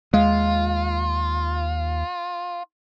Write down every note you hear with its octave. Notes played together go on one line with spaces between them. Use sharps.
D#2 G#3 F4 F5